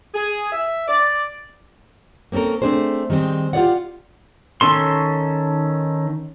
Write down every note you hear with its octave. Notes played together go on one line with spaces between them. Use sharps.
G#4
E5
D5
A#3 C4 C#4 A4 A#4
A3 C4 D4 G#4 C5
D#3 G3 G#3 C4
F4 G4 G#4 C#5 D5 F#5
D#3 C#4 A4 C6